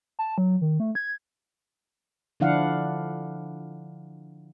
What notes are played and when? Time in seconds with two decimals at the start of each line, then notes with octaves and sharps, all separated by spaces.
0.19 A5
0.38 F#3
0.62 D#3
0.80 A3
0.95 G#6
2.40 D3 F3 D4 E4 F5 F#5